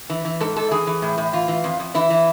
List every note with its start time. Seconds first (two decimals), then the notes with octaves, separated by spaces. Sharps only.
0.10 E3
0.25 E3
0.40 G#2 A4
0.56 G#2 A4
0.71 E3 G#4
0.87 E3
1.02 A2
1.18 A2
1.33 E3 F4
1.48 E3
1.64 F2
1.80 F2
1.95 E3 E4
2.10 E3